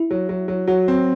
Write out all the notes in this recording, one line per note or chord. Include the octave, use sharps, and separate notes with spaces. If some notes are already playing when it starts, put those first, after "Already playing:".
Already playing: E4
F#3
F#3
F#3
F#3 F#4
C4